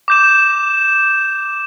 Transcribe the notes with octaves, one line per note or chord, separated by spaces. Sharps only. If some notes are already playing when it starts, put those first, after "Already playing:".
D6 G6 E7